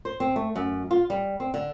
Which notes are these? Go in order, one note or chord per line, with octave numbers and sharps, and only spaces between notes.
C5
C4
A3
F#2
F4
G3
C4
D3